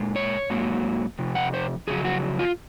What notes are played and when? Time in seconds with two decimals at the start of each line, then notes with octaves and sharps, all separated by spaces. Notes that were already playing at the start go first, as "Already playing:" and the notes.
Already playing: A#2 G#3
0.16 C#5
0.50 G#2 F#3 A#3
1.19 F2 C3
1.35 F#5
1.54 C5
1.87 F2 C#3 F#3 G#4
2.05 F#4
2.39 F4